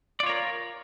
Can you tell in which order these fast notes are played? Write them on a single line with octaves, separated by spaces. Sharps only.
D5 F4 C#5 A#4